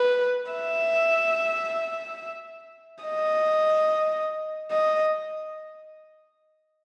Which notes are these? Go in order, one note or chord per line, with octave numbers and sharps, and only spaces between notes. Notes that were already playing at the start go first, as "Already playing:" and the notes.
Already playing: B4
E5
D#5
D#5